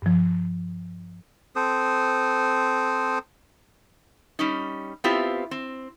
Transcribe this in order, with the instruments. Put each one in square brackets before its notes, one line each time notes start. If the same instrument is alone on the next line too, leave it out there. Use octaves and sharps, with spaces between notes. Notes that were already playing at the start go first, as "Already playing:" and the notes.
[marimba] G2 F3
[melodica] C4 A4 C5 D#6
[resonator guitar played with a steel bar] G3 C#4 D#4
B3 C4 E4 F4 G4
C4